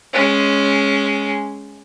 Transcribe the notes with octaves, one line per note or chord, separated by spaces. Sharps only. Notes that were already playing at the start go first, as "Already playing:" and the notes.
G#3 C#4